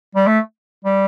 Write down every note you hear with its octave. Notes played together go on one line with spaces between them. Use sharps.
G3
A3
G3